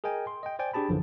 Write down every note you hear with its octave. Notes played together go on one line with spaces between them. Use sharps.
G#4 A#4 D#5 G5 G#5
C6
D#5 G5
C5 D5 G5 G#5
D4 G4 G#4 A5 B5
A#1 F#2 D3 E3 F3